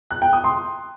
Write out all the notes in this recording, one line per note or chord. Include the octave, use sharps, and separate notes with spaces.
F#6
G5
D#6
C6